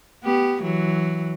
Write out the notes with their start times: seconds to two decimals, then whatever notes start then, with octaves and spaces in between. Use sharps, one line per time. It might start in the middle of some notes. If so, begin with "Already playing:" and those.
0.24 B3 G4
0.62 E3 F#3